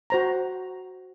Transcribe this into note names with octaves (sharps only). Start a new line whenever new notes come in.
F#4 C5 A#5